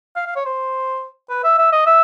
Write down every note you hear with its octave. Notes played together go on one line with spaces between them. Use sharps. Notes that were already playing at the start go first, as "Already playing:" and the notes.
F5
F5
C#5
C5
B4
E5
E5
D#5
E5